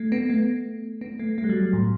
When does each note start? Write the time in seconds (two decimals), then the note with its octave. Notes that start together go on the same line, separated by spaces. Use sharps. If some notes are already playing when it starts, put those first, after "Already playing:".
Already playing: A3
0.12 B3
0.30 A3
1.01 B3
1.19 A3
1.38 A3
1.44 G3
1.49 F#3
1.73 A2